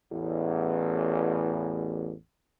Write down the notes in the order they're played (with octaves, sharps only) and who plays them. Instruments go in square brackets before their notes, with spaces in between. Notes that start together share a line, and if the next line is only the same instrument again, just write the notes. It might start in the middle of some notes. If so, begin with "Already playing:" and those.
[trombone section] A1 E2